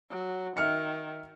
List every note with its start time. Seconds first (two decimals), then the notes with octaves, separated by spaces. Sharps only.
0.11 F#3
0.57 D#3 E5 F6 C#7